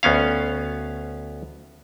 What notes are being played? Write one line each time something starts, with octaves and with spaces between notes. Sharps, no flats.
D2 B3 C#4 F5